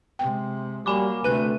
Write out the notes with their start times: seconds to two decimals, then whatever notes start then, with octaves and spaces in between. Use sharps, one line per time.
0.19 C3 G#3 G5
0.86 F#3 G3 A#3 G#5 B5 D6
1.24 D2 C3 A3 B4 F#6 D#7